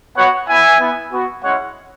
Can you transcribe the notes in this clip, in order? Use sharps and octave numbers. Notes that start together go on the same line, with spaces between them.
B3 F#4 C#5 F#5
B3 E4 E5 G#5
B3 E4
B3 F#4
G#3 C#4 E4 C#5 F#5